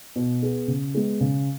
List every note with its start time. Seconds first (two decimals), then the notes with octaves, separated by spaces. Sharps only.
0.16 B2
0.43 B3 G#4
0.68 C#3
0.95 G#3 B3 G#4
1.21 C#3